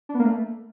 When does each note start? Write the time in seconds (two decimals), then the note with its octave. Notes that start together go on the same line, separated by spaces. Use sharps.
0.09 D4
0.14 B3
0.19 A#3
0.25 A3